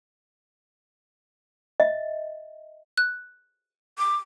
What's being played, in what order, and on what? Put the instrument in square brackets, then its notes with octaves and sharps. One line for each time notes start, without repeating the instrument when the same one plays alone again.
[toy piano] D#5 E5
[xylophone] F#6
[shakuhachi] D6